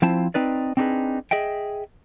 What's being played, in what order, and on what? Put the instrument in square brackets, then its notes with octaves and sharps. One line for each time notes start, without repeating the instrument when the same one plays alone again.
[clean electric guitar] F3 C4 E4 C5 A5
C4 D#4 B4 D5
C4 D4 D#4 F#4 G#4 B4
G#4 D#5 E5 G5